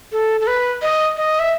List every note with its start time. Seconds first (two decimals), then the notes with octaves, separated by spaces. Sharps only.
0.12 A4
0.41 A4
0.47 B4
0.82 D#5
1.17 D#5
1.40 E5